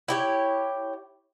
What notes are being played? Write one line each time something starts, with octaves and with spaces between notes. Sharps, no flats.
E4 G4 C#5